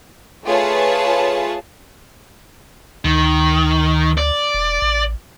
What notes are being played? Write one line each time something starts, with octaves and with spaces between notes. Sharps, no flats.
A3 F4 G#4 B4 C#5 A5
D2 D#3
D5
E1
A1